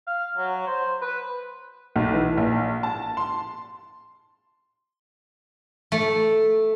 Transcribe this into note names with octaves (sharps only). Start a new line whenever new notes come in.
F5
F#3
C5
B4
B1
E3
A#1
A5
C6
A3